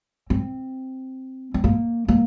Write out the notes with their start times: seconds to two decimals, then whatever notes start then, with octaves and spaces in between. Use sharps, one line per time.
0.30 C4
1.54 C4
1.64 A#3
2.08 A#3